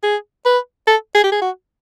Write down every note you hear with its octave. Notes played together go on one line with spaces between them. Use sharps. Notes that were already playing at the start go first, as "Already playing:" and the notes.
G#4
B4
A4
G#4
G4
G#4
F#4